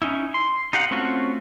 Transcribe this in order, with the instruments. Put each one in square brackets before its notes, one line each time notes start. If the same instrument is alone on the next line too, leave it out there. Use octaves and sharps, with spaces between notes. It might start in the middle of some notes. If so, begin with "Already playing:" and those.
[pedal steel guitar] C#4 D#4 E4
C6
D#4 G4 F5 F#5
A3 C4 C#4 F4 F#4